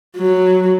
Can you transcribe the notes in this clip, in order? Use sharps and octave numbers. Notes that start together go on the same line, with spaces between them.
F#3